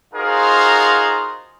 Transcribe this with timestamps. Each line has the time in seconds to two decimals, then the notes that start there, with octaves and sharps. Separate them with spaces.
0.13 D#4 F4 F#4 G#4 A#4 C5